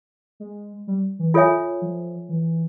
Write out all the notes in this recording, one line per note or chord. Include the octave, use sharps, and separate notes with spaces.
G#3
G3
E3
F4 A4 C#5 E5 G#5
F3
E3